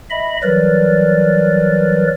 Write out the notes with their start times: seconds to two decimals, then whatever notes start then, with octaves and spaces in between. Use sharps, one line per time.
0.10 D#5 E5 B5
0.43 E3 F#3 G3 A#4 B4 D5